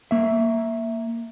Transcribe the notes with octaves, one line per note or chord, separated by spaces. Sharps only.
A#3 E5